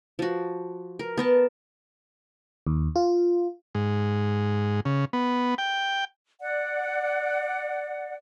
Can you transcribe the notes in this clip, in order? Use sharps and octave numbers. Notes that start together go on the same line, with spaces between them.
F3 F#4
A#4
B3 A#4 A5
D#2
F4
G#2
C#3
B3
G5
D5 F#5